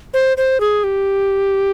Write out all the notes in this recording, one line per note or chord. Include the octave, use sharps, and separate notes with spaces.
C5
C5
G#4
G4